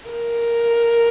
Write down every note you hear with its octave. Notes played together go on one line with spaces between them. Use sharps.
A#4